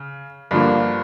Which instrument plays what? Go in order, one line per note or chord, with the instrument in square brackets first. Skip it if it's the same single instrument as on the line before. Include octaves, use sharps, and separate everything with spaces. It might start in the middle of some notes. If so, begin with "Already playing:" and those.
Already playing: [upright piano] C#3
G2 D3 F3 A#3